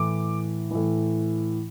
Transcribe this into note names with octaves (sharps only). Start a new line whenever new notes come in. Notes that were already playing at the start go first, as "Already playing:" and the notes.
Already playing: A2 E3 D6
A2 E3